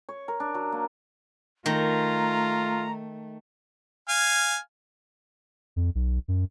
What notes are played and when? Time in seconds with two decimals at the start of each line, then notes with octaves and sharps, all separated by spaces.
0.09 C#5
0.28 A#4
0.40 D4
0.54 F#3
0.72 A#3
1.66 D#3 A3 F4 A#5
4.09 F5 G#5
5.76 F2
5.95 B1
6.28 F#2